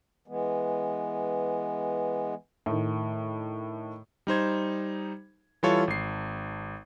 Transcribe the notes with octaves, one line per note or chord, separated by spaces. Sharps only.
E3 G#3 B3
A2 D#3
G3 D#4 C5 G#6
E3 G3 E4 F4 A4 C#5
G#1 C7